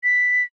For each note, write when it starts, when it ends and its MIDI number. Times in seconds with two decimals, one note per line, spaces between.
0.04 0.43 95